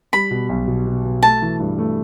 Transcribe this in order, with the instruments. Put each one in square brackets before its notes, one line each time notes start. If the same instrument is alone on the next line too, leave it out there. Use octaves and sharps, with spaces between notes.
[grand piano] G3 [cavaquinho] B5
[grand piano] B2
B1
B2
B2
B2
[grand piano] A3 [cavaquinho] A5
[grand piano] E3
G2
A3